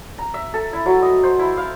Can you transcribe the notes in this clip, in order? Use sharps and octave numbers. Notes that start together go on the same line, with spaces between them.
A#5
E5
A4
E4
F#3
D#5
C5
E4
F5